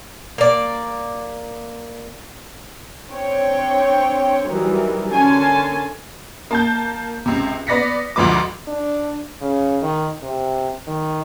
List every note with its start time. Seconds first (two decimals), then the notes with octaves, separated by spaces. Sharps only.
0.38 A#3 D5
3.08 C4 D4 C#5 G5
4.48 E3 F#3 G3 D#4 A#4
5.12 D3 C#4 A#4 G#5 A5 C6
6.51 A#3 A5 G6
7.26 C#2 C3
7.67 B3 B4 D5 A#6 B6 C#7
8.16 D2 G#2 F3 B4 D6
8.68 D4
9.41 C#3
9.82 D#3
10.23 C3
10.87 D#3